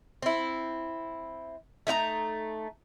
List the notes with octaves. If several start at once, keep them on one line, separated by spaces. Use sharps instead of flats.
C4 E4
A3 D#4 F5 A#5